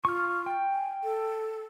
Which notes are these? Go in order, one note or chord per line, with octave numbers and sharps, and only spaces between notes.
F4 C#6 F6
G5
G#5
A4